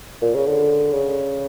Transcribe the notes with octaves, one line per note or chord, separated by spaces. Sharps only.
A#2
C#3
D3
C#3